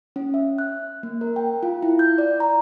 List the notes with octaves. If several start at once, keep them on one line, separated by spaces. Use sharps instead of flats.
C#4
E5
F#6
A#3
A#4
G5
F4
E4
G6
D5
A#5